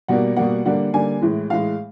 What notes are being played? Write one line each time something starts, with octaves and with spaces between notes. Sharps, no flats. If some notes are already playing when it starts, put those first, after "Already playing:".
B2 G3 A#3 F#5
B2 G3 A#3 F#5
D3 G3 A#3 F#5
D3 G3 A#3 G#5
A2 E3 G#3
A2 E3 G#3 F5